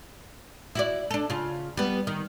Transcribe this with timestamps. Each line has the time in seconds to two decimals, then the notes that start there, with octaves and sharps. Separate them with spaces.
0.75 E4 F#4 D5
1.11 D4 A4
1.30 C#3 F4
1.77 G3 B3
2.07 D#3